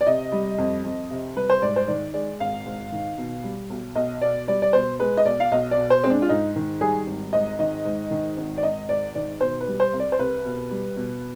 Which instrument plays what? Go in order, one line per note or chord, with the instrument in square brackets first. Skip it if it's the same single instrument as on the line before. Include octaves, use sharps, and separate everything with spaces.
[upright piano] D5
C3 D#5
G3
F2
F2
C3
G3 B4
C5
G#2 D5
C5
D#3 D5
G#3 D5
G#1 F5
G#2
D#3
B2
G3
B1
B1 D#5
B2 D5
G3 D5
D5
B2 C5
G#3 B4
D#5
B1 D5
F5
B1 D#5
D5
B2
C5
G#3 C4
D4
F4
G#2 D#4
D#3
G3 G#4
G#1
G#2 D#5
D#3 D#5
G#2
D#3
G#1
D5
G#1 D#5
G#2 D5
D#3 D5
B2 C5
B4
G3
C5
C2
D5
C5
C2 B4
B2
G3
B2